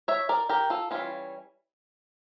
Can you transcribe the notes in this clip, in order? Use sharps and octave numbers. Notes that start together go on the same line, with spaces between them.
C#5 E5
A#4 D5
G4 A#4
F4 A4
E3 G3 C#4 F4